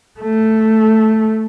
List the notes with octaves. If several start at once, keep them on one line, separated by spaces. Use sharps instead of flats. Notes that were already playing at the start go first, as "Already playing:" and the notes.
A3